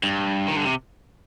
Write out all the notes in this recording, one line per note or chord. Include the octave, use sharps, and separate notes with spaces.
G2
D#3
D3
C3